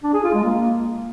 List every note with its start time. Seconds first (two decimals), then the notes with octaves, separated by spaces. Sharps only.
0.03 D4
0.13 G#4
0.24 F4
0.34 G#3
0.44 A#3